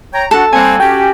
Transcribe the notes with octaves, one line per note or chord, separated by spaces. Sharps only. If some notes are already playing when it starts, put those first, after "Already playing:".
C#5 G5 A#5
D4 F#4 A4 F#5
G3 A#3 C4 F#5 G#5
C#4 F#4 G4 G5